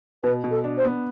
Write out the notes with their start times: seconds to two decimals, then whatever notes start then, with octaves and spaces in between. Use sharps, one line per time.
0.23 B2 B4
0.44 B2
0.51 A4
0.64 D4
0.78 C5
0.85 B3